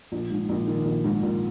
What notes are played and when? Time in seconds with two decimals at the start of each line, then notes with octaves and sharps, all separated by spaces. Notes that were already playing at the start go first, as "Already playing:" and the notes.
0.12 A#1
0.30 G#2
0.49 A#1
0.67 D#3
0.85 A#1
1.04 G#2
1.22 A#1